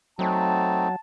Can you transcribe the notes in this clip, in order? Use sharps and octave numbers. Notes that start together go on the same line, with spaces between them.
F#3 A3 C4 D#4 A5